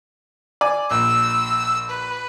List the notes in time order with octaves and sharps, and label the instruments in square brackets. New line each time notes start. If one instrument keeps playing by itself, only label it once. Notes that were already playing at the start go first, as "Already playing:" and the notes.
[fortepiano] D5 G#5
[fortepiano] A#1 [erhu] E6
[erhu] B4